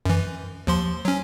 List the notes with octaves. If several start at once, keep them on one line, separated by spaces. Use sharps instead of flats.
F#2 E3
D#2 F3 C6
F#3 C#4